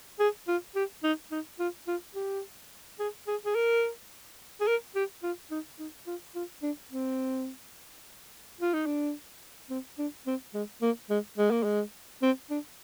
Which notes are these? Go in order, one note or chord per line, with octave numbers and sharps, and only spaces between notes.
G#4
F4
G4
D#4
D#4
F4
F4
G4
G#4
G#4
G#4
A#4
G#4
A#4
G4
F4
D#4
D#4
F4
F4
D4
C4
F4
D#4
D4
C4
D4
C4
G#3
A#3
G#3
G#3
A#3
G#3
C4
D4